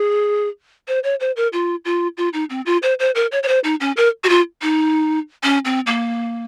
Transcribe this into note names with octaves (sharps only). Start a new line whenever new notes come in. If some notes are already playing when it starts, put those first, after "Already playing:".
Already playing: G#4
C5
C#5
C5
A#4
F4
F4
F4
D#4
C4
F4
C5
C5
A#4
C#5
C#5
C5
D#4
C#4
A#4
F#4
F4
D#4
C#4
C4
A#3